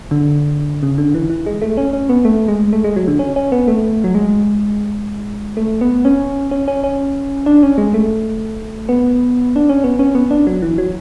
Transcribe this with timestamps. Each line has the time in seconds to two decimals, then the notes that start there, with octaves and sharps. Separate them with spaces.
0.11 D3
0.83 C#3
0.98 D3
1.14 E3
1.30 E3
1.46 G#3
1.62 A3
1.77 C#4
1.93 C#4
2.09 B3
2.25 A3
2.48 G#3
2.73 A3
2.84 G#3
2.96 F#3
3.08 D3
3.19 C#4
3.36 C#4
3.52 B3
3.68 A3
4.04 F#3
4.15 G#3
5.57 A3
5.81 B3
6.05 C#4
6.51 C#4
6.68 C#4
6.84 C#4
7.46 D4
7.63 C#4
7.78 G#3
7.94 A3
8.89 B3
9.56 D4
9.69 C#4
9.84 B3
9.99 C#4
10.15 B3
10.31 D4
10.47 F#3
10.62 E3
10.78 F#3